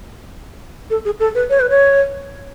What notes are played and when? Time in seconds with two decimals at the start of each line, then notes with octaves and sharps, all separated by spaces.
0.90 A4
1.05 G#4
1.19 A4
1.35 B4
1.50 C#5
1.60 B4
1.70 C#5